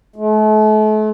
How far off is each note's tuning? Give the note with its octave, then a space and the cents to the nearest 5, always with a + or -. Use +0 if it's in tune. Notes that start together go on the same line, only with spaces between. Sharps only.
A3 -40